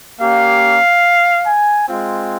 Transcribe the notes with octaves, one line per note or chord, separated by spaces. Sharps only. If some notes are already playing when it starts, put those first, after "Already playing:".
A#3 C#4 G4 F5
G#5
G#3 C4 F4